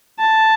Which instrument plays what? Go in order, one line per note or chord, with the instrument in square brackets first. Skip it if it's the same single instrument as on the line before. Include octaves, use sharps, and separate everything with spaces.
[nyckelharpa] A5